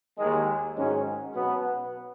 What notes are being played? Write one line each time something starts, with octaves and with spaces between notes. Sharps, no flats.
D#2 D#3 G#3
G#2 D#3 F#3 C#4 G#4
B2 F#3 B3